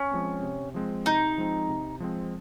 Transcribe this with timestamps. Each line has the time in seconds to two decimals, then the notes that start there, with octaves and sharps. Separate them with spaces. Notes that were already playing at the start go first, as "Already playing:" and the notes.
Already playing: C#4
0.11 F3 G#3 C4
0.43 C3
0.74 F3 G#3 C4
1.05 C3 D#4
1.38 F3 G#3 C4
1.69 C3
2.00 F3 G#3 C4